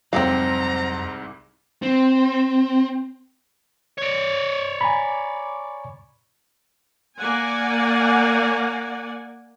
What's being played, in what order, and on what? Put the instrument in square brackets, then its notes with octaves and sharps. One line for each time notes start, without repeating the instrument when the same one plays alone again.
[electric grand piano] C2 G#2 [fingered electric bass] F2 F#3 [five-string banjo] C4 A4 F5 [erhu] A#5
[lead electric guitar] C4
[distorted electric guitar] C#5 D5
[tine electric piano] G#5 A#5 B5
[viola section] A#3 D5 F#5 G#5